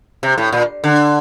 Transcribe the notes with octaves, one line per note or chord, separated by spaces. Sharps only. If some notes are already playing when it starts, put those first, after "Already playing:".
C3
A2
A#2
D3